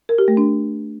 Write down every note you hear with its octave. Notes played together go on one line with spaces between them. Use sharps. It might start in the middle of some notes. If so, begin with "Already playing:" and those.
A#4
G4
A3
D4